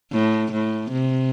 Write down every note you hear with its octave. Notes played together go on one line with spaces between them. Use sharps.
A2
A2
C3